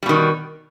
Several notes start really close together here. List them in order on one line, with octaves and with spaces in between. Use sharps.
G3 B2 D#3